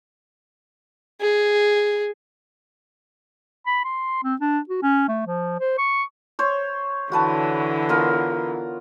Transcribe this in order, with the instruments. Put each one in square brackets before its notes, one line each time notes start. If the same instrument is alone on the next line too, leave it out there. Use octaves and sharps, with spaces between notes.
[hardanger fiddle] G#4
[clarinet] B5
C6
C4
D4
F#4
C#4
A3
F3
C5
C#6
[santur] C5 C#5
[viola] D3 E3 [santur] F#4 B4 A5
[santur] B3 F4 A#4